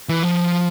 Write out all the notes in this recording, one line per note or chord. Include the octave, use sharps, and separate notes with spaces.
E3
F3